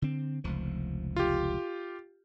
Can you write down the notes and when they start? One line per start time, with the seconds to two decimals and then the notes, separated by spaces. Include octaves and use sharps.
0.02 D3 C4
0.44 F1 C#2 F3
1.16 F4 G4